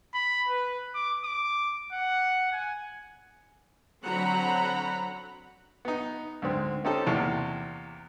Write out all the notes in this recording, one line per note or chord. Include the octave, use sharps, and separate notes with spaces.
B5
B4
D6
D6
F#5
G#5
D3 F#3 C4 F#5 A#5 B5
B3 D#4
D2 G#2 C4
C4 C#4 D#4 G4 A4
E2 C3 A#3 A5 C#6